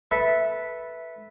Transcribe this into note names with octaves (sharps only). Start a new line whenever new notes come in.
A4 B4 E5